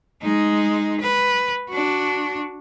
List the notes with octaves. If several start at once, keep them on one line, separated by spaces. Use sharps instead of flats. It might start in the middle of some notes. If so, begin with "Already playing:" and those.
G#3 D#4
B4
D4 F#4